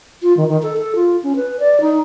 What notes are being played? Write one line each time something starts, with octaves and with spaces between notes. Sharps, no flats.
F4
D#3
D#3
A4
A4
F4
C#4
B4
D5
D#4